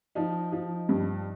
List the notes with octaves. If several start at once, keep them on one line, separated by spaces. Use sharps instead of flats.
F3 D#4
F3
G2